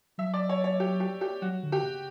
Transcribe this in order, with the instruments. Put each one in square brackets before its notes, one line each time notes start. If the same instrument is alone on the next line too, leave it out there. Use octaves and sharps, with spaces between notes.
[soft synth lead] F#3 [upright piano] E5
[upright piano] D5
C#5
C#5
G4
G4
G4
[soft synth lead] F#3 [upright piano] F#4
[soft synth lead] D3
[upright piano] G4
[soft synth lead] C#3